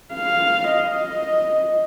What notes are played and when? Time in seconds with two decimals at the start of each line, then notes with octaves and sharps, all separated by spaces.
0.14 F5
0.69 D#5